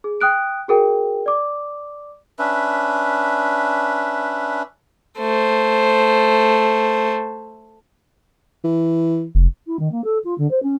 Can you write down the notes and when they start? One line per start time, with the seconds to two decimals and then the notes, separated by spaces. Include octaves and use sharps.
0.04 G#4
0.21 G5 D#6 F#6 D7
0.68 F#4 G#4 A#4 G5
1.26 D5 D6
2.39 C#4 D4 B4 E5
5.18 A3 C5
8.64 E3
9.35 F1
9.67 E4
9.79 D#3
9.92 A#3
10.04 A4
10.24 F4
10.38 D3
10.51 C5
10.63 C#4